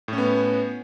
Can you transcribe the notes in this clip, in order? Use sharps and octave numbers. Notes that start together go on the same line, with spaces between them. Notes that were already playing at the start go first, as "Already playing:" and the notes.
A2 B3 C#4